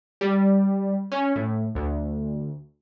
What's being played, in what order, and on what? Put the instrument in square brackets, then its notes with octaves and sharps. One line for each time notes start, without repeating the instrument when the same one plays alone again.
[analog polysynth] G3
C#4
A2
D2